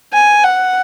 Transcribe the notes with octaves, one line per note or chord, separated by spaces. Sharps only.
G#5
F#5